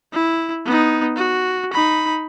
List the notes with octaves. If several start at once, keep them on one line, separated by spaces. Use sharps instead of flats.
E4
B3 D#4
F#4
D#4 B5